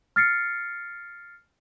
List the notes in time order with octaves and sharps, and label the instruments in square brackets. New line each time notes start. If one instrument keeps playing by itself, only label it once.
[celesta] F6 A6 C7 C#7